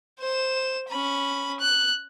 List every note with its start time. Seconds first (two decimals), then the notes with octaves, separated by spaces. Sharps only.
0.19 C5 E7
0.88 C#4 B5
1.60 F#6